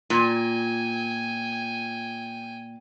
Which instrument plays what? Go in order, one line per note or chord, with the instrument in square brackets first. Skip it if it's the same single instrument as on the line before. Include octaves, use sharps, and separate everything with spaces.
[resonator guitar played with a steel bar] A#2 [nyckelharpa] G5 G#5